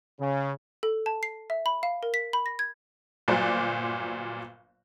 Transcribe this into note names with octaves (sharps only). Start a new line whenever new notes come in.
C#3
A4
A5
C7
E5
B5
F5
A#4
B6
B5
A#6
G#6
G1 A#2 F#3 C5 D5 F#6